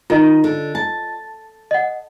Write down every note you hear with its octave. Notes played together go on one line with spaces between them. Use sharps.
D#3 F4 D#5
D3
A5
D#5 F#5